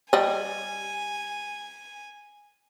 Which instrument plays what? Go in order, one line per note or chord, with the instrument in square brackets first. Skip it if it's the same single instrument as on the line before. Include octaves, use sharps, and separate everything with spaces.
[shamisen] G3 D#5 [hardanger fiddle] G#5